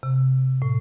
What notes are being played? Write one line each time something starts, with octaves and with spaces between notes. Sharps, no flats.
C3
A2